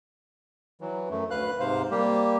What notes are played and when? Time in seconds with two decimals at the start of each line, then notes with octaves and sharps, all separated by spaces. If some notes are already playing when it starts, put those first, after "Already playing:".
0.81 E3 F#3
1.10 F#2 A3
1.31 D2 B4 F5 F#6
1.60 G#2 C3 C5 F5
1.91 G3 A#3 G4